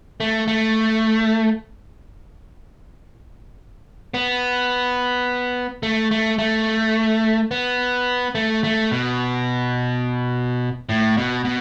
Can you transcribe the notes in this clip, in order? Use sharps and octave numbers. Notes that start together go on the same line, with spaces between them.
A3
A3
B3
A3
A3
A3
B3
A3
A3
B2
A2
B2
B2